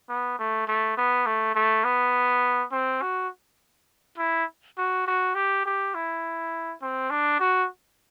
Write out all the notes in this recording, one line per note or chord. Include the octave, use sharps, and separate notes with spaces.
B3
A3
A3
B3
A3
A3
B3
C4
F#4
E4
F#4
F#4
G4
G4
E4
C4
D4
F#4